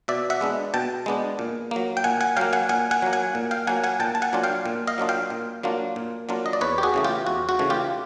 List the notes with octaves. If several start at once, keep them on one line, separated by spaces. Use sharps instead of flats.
B2 D5 E5
E5 F#5
G#3 B3 D4
B2 G5 A5
G#3 B3 D4
A#2
F#3 A#3
G5
A#2 F#5 G#5
F#5 G#5
F#3 A#3 F5 G5
F#5 G#5
A#2 F#5 G#5
F#5 G#5
F#3 A#3
F#5 G#5
A#2
F5 G5
F#3 A#3 F#5 G#5
F#5 G#5
A#2 G5 A5
A5
F#5 G#5
F#3 A#3 D4 F4
F5 G5
A#2
D#5 F5
F#3 A#3 D4 F4
F5 G5
A#2
F#3 A#3 D4 F4
A#2
F#3 A#3 D4 F4
D#5
D5
E2 B4 C#5
G4
F#4 G#4
C#3 E3 A3
F4 G4
E2 F#4
F#4
C#3 E3 A3
F4 G4